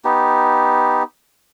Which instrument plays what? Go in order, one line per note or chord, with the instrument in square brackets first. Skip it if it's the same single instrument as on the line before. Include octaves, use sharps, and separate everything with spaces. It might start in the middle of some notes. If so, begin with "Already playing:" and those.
[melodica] B3 D#4 G4